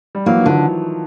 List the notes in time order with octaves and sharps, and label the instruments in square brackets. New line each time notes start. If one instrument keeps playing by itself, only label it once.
[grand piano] G3
[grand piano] E3 F#3 [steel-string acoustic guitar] A#3
[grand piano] E3
[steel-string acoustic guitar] D3 [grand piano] D#3 F3